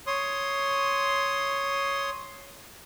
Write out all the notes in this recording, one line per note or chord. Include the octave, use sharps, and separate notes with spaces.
C#5 C6 D#6